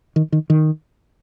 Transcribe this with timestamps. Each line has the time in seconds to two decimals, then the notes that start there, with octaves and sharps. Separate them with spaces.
0.16 D#3
0.32 D#3
0.50 D#3